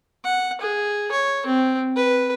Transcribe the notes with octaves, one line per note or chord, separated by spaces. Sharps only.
F#5
G#4
C#5
C4
B4